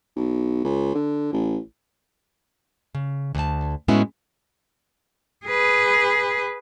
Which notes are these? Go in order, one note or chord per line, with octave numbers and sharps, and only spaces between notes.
B1
C#2
D3
A1
C#3
D2 A5
A2 G#3 B3 C#4 E4 F#4
G#4 B4